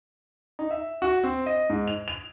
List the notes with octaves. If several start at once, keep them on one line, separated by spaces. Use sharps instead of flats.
D#4
E5
F#4
C4
D#5
G#2
F7
F7